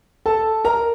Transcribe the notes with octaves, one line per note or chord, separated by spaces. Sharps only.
A4 A5
A#4 A#5